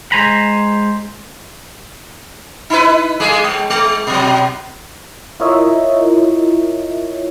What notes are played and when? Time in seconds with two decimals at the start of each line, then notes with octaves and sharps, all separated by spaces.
0.12 G#3 C5 G#5 A#5 B5
2.70 D#4 E4 B4
3.20 G#3 A3 G#4
3.44 G#3
3.70 G#3
4.07 B2 F#3
5.40 E4 F4 A#4 C#5 D#5 E5